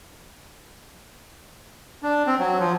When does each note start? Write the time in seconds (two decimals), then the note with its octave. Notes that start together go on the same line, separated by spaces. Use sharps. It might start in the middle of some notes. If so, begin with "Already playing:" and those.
2.03 D4
2.27 C4
2.39 F#3
2.59 F3